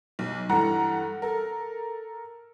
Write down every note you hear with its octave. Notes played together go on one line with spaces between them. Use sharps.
B1
G2 E3 A4 F#5 A#5
A4 A#4